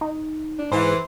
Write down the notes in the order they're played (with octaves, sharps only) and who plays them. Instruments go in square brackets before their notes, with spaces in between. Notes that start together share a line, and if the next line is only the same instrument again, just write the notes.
[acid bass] D#4
[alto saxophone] D4
[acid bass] G#2 [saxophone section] E3 [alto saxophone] C5